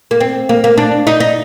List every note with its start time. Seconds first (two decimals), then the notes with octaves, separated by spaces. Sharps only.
0.11 A#3
0.21 C4
0.49 A#3
0.64 A#3
0.78 D4
1.07 D#4
1.20 D#4